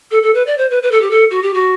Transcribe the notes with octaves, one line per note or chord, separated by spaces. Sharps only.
A4
A4
B4
D5
C5
B4
B4
A4
G4
A4
F#4
G4
F#4